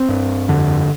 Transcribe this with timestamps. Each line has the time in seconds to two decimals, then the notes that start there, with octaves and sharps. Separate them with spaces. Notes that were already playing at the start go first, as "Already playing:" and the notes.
Already playing: C4
0.09 G2
0.48 F2 D3